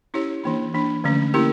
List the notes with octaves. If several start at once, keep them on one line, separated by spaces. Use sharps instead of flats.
C#4 E4 G4 C#5
E3 A#3 D4
E3 A#3 D4
D3 F3 A3 C#4
A#3 C#4 E4 G4 A#4